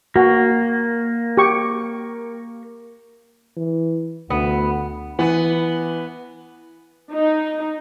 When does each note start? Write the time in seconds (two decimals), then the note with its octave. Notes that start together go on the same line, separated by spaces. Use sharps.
0.16 A#3 F#4
1.37 G4 C#6
3.57 E3
4.30 D2 D3 B3 F#5
5.19 E3 B3
7.14 D#4